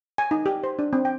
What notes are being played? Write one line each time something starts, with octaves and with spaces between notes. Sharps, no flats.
G#5
D#4
G4
C5
D4
C4
G5